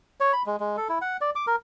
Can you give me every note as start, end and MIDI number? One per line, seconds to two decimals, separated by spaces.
0.20 0.33 73
0.33 0.43 83
0.46 0.56 56
0.60 0.76 56
0.77 0.88 69
0.89 0.99 64
1.02 1.17 78
1.21 1.30 74
1.35 1.46 86
1.47 1.56 70